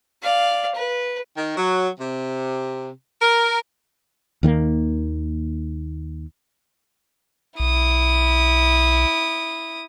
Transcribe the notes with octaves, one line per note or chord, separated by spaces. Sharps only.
D5 F5
B4
D#3
F#3
C3
A#4
D#2 D#3 G#3 A#3
B1 E4 D#6